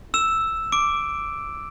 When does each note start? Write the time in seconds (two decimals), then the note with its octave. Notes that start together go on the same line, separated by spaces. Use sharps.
0.14 E6 E7
0.72 D6 D7